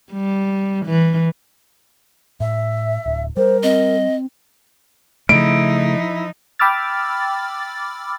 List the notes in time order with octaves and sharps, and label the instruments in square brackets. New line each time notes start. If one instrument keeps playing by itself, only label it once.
[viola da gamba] G3
E3
[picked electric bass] A2 [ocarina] E5
[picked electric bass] D1
[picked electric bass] G3 [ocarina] A#4 [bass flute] C5
[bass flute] C4 [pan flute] D#5
[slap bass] C#3 A3 [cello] F3 D#4 [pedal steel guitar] E4 [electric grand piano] D7
[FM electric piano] G5 B5 D6 E6 F6 A6